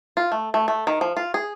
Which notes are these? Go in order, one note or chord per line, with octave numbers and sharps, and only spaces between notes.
F4
A3
A3
A3
D#3
F3
F4
G#4